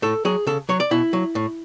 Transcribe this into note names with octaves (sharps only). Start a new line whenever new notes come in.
A2 A4
F#3 G#4
C#3 A4
F#3 C#5
D5
B2 E4
F#3
A2